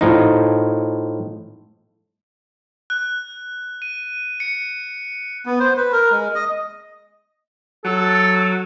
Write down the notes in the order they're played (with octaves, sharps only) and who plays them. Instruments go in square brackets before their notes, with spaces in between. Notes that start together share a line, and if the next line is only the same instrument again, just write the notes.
[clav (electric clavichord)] A2 F3 D#4
[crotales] F#6
D#7
C#7
[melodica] B3
C5
B4
A#4
G#3
D#5
[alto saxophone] F#3 [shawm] A4